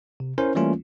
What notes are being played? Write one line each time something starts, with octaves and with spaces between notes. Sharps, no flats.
C3
C#4 E4 A#4 C5
E3 G3 A3 A#3 C#4 F4